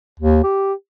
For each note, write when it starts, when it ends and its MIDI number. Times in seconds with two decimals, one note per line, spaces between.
0.20 0.43 39
0.44 0.73 67